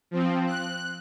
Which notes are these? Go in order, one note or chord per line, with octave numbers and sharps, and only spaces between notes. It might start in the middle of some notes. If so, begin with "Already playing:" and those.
F3 C4
F#6